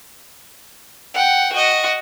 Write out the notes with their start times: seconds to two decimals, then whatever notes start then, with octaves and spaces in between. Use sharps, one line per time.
1.14 F#5 G5
1.52 F#4 D#5